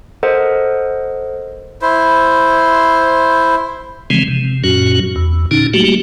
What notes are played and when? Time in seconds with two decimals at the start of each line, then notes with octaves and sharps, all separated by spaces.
0.23 A4 A#4 C5 D#5 F#5
1.82 E4 C5
4.10 C#3 E3 F3 G#3 C4
4.28 C3
4.64 F#2 A#2 F#3 C#4 F#4
5.16 E2
5.51 A#2 D3 C#4 D#4
5.74 F#3 G3 A3 A#3 F#4 G4